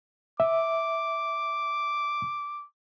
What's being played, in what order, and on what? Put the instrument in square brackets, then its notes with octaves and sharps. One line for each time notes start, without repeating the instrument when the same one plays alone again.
[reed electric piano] E5 [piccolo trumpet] D6